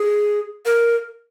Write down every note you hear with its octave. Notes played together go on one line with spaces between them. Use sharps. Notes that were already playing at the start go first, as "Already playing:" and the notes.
Already playing: G#4
A#4